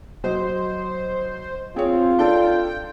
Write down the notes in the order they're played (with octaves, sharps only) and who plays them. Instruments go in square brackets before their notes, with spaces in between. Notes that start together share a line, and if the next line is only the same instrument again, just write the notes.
[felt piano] F#3 D#5 [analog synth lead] C5
[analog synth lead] C4 [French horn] F4 [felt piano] G#4 C#5
[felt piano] D4 A4 [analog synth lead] G5